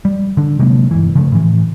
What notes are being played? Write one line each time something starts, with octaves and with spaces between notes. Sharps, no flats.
G3
D3 D4
C3 F#3 G#3 A#3
G1 C2 E3
C#3 F3 A3
A2 E3